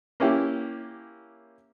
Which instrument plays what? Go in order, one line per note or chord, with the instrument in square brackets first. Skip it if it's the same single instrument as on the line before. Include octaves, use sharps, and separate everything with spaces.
[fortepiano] A#3 C#4 E4 G4